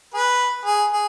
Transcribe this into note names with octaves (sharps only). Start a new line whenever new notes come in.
G#4 B4
G#4
G#4